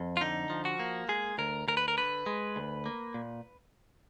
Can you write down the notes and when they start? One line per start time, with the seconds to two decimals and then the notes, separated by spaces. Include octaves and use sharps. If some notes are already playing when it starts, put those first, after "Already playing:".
Already playing: F2
0.17 F4
0.21 D3 D#4
0.50 F3
0.65 F#4
0.80 A#3
1.08 G#3 G#4
1.38 D2 A#4
1.68 D2 A#4
1.77 B4
1.88 A#4
1.97 D3 B4
2.26 G#3
2.56 D2
2.86 A#3
3.14 A#2